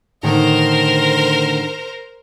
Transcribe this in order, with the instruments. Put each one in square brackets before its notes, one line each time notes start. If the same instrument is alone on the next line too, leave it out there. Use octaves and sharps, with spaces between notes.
[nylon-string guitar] A2 D3 D#3 [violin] A#4 C5